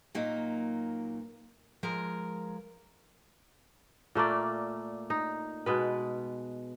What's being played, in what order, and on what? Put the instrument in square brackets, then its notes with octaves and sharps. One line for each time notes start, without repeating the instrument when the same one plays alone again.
[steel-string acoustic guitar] A#2 F#3 A#3 D#4
F3 G#3 A#4 A#5
[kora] A#2 A3 A#3 D5
D#4
B2 G#3 B4